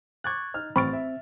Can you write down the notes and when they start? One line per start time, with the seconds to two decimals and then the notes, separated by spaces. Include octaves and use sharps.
0.24 C#6 D6 F#6 G#6 A6
0.54 D#4 F6
0.76 A1 C4 B5 C#6 F6 A6 D7
0.93 E5